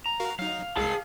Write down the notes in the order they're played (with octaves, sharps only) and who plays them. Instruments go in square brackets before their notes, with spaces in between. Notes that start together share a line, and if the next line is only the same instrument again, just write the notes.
[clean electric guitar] A#5
[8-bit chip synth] F#4 A#4 F5
[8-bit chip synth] F#3 D#4 [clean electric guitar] F5
[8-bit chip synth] C2 G#3 C7 [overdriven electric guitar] G#4 A5